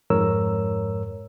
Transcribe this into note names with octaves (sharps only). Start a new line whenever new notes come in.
F2 G#2 A#4 C#5 E6